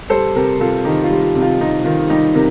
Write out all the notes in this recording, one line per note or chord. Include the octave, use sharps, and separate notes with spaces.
G3 A4 C5
C3 G4 A#4
C3 F4 A4
D#3 D#4 G4
F4
G3
F4
C3
F4
C3 D#4
D#3 F4
G3 D#4 G4
C3 A#4